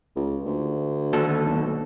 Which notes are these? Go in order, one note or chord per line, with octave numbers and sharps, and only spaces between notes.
C#2
D2
D#2 F#4 A4
B1